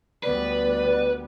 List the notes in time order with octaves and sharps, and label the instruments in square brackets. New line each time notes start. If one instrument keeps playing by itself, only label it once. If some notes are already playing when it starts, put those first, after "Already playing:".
[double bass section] D2 G3 B3 [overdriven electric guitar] B4 [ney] D5